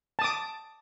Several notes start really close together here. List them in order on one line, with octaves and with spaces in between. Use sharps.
A5 D#6 D6